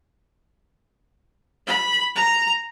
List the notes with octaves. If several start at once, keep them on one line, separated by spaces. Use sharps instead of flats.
B5
A#5